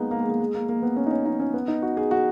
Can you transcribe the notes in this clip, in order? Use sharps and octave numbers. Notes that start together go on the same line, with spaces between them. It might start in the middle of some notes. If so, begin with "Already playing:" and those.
Already playing: G#3 A#3 B3 D#4
A#3
G#3
A#3
G#3
A#3
A#3
B3
C#4
D#4
C#4
D#4
C#4
B3
D#4
F#4
G#4
F#4